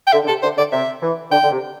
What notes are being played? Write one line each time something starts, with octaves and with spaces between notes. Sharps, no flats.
G5
D3 E5
D3
C3 A4
D3 C5
D3 D5
C3 E5
E3
D3 G5
D3
C3